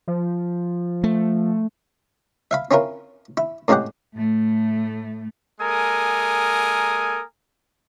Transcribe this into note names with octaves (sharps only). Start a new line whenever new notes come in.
F3
A3
E5 F5 B5
C4 C#4 E4 F4 A#4
E4
A2 C#3 G#3 C4 G4 F#5
A2 A3
G#3 A#3 A4 A#4 G#5 D#6